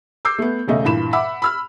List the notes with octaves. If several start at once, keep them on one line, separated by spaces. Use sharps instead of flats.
D6 E6 G6 C7
A3 B3
E1 C#3 A3 D#5
G2 A#2 E3 B5 E7
E5 F#5 B5 D6 E6
B5 E6 F6